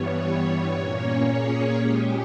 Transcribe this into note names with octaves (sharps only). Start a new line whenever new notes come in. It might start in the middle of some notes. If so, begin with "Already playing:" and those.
Already playing: G2 E3 G3 B3 C#5
C#5
A#2 A#3 C#4
G#4
A#2 G#3 C#4 G4